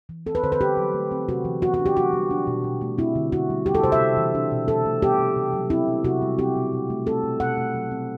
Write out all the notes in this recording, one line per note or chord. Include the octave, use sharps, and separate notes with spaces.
E3
C4 A4
B4
D3 C5
B4
D3 G4
F#3
A3
C4
C3 F#4
E3
B3 F#4
F#4
D4
G4
C3 F#4
G3
D4
B2
B2
A3
C4 E4
D3
D3 F#4
G3
G3 G4
A4
C3 C5
E5
C3
E3
D4
B2
B2 A4
A3
B3 G4
C3
C3
F#3
C4 E4
C3
C3 F#4
G3
C4 G4
B2
B2
A3
C4 A4
B2
B2 F#5
A3
F#3
C4